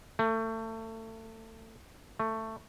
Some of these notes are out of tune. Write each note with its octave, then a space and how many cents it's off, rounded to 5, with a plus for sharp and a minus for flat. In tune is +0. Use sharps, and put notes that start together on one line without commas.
A3 +30
A3 +15